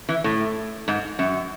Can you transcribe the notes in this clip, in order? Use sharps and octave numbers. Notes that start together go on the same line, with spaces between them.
E3
A2
G#2
F#2